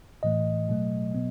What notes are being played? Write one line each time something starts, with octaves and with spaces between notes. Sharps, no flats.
A2 E3 A3 D#5
B2 F#3 A3
B2 F#3 B3